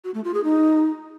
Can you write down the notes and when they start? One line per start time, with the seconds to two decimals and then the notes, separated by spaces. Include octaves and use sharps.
0.04 F#4
0.14 A3
0.24 F4
0.34 G#4
0.44 D#4